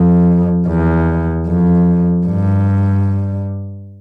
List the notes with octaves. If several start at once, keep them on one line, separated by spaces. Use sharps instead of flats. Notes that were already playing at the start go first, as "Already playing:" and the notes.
Already playing: F2
E2
F2
G2